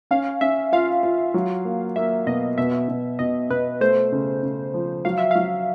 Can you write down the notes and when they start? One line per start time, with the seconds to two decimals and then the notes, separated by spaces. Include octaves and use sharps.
0.11 C#4 F5
0.41 C#4 E5
0.73 F4 F5
1.03 F4
1.34 F#3
1.65 A#3
1.96 A#3 E5
2.26 B2 D#5
2.58 B2 E5
2.88 B2
3.19 B2 D#5
3.50 B2 B4
3.81 A3 C5
4.12 C#3
4.43 C#3
4.74 F3
5.05 F#3 F5
5.18 E5
5.31 F#3 F5